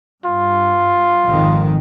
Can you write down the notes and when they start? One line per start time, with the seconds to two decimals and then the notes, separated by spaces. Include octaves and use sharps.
0.25 G2 F4
1.28 G#1 F2 D#3